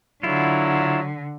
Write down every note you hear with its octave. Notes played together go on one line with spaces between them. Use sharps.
D3 F#3 E4 F4